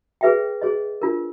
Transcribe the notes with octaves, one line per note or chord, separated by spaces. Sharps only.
G#4 B4 E5 G5
G#4 C5 D#5
D4 F4 A#4